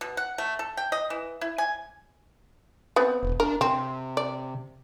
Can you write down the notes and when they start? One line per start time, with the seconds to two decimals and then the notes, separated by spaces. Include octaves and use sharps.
0.01 B2
0.17 F#5
0.38 A3
0.59 A4
0.77 G5
0.92 D#5
1.10 E3
1.41 E4
1.58 G#5
2.96 B3 C4 B4
3.23 E1
3.40 D4 A#4
3.61 C3 C4
4.17 D5